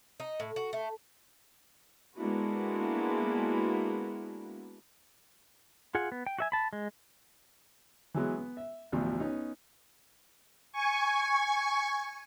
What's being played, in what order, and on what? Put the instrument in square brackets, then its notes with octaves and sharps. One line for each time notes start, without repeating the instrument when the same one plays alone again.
[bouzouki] D#4
A2
F#4
A3
[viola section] G#3 A#3 B3 D4 E4 F#4
[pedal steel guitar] F4 G#4 F#5
B3
G5
F#4 E5 G#5
A5 B5
G#3
[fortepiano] E3 F#3 G#3 B3
B3
E5
A1 D2 B2 F3
B3 C#4 D#4
[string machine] G#5 C#6